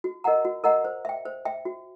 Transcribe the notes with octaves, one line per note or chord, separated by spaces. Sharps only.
F#4
A#4 D#5 F#5 A#5
F#4
A#4 D#5 F#5 A#5
C5
E5 G5
C5
E5 G5
F#4